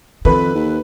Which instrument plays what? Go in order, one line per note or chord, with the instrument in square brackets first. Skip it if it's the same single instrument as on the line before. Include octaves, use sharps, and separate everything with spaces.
[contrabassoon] F2 [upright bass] D#3 [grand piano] A4 B5 [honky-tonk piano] B4
[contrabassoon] D#2